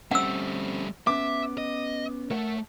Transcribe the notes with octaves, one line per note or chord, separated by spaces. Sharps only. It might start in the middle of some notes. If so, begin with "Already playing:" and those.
G3 A3 C4 C#4 F#5 E6
B3 C#4 E5 D6
D#5
A3 A#4 C#5 F#5